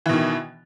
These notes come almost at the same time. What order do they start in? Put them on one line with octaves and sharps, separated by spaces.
E3 B2 D#3